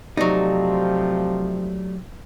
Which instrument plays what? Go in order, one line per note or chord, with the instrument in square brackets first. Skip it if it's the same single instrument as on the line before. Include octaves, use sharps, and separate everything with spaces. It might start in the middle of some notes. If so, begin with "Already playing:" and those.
[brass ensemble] C3 F3 [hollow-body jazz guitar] F#3 D#4 [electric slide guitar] A3 G4 D5